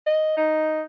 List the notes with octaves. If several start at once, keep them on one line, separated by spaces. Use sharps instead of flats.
D#5
D#4